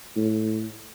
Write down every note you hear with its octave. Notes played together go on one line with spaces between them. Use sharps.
A2